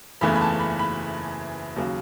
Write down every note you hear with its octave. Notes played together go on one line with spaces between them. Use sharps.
F#1 E2 C#3 E3 A3 B5
B5
A5
B5
B5
D#2 C#3 F#3